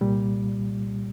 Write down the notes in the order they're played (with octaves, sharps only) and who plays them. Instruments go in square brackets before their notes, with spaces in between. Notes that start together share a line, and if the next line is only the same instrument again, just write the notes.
[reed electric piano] C2 A#2 G3